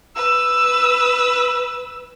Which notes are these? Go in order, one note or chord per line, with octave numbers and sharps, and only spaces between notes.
B4 E6